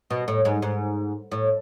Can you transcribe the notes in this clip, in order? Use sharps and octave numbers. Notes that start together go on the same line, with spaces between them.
B2
A2
G#2
G#2
A2